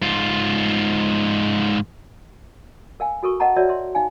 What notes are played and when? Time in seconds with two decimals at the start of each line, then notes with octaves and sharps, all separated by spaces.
0.02 G#2 F4
3.00 A#4 F5 G#5
3.23 F#4 A4 A#4 C#6
3.40 A#4 D#5 F#5 A5 A#5
3.56 F#4 A#4 C#5 D5 E5
3.69 A#4 E5 C6
3.95 D#4 F5 G#5